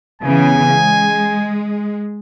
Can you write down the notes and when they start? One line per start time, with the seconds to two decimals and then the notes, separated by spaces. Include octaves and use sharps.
0.22 C#3 E3 B3 G#5
0.72 G#3